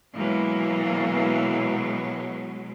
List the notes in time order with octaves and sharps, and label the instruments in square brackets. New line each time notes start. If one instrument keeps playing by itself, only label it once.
[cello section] B2 F#3 G#3 [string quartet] E3 A#3